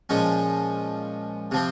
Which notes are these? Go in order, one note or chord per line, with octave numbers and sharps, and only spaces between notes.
A#2 F3 G#3 C#4
C3 F3 C4